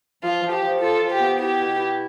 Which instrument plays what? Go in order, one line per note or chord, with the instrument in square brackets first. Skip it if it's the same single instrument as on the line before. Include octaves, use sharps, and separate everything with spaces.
[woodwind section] F3 [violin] F4
[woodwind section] F3
[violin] G4
[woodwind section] F3
[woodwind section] F4 [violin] A4
[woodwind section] F3
[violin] G4
[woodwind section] B3
[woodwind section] E4 [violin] G4
[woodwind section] B2
E4